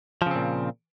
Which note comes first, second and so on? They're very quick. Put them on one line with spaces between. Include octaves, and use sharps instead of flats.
F3 C#3 C4 A#2